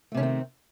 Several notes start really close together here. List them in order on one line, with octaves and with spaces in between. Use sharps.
A3 C3 C#4 D#3 C4